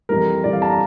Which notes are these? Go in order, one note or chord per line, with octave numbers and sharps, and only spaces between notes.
F2 E3 G3 A#4
F2 E3 G3 D5
F5
A5
A#5